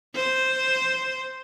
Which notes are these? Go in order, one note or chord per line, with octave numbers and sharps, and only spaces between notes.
C5